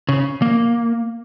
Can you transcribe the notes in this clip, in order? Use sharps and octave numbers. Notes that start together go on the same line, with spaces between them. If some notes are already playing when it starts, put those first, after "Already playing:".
C#3
A#3